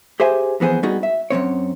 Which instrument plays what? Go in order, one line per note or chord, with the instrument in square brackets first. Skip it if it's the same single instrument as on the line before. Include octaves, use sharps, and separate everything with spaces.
[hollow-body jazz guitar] G4 G#4 C5 E5 G#5
F2 E3 B3 G#4 C5
G3 B3 D#4 F#4 G#4
E5
F#2 C3 C4 C#5